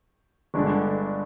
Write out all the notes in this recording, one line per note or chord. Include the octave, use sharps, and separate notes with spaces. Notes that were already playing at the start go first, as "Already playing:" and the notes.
G1 G2 D3 G#3 D4